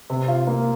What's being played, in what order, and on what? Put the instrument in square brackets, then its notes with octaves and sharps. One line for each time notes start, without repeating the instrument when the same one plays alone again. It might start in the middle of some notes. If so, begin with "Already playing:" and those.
[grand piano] C3
F4
A#3